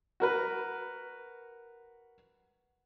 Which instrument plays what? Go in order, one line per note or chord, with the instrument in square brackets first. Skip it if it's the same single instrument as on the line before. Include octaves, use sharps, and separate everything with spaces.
[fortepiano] F#4 A#4 B4